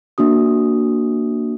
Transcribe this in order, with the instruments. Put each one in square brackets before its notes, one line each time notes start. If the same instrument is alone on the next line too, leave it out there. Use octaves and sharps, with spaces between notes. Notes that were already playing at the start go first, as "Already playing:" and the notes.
[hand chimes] A#3 D4 F#4 D#6